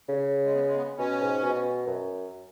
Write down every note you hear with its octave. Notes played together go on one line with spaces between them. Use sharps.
C#3
G#3
B3
G#3
B3
B2 C#4
G#2
B2
F#2